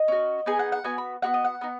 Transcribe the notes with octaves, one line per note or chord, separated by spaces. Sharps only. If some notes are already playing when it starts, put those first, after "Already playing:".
Already playing: D#5
C#4 F#4
B3 D#4 G#4 G#5
F#5
F#5
B3 F#4 G#5
B5
B3 D#4 F#4 F#5
D#5
F#5
B3 D#4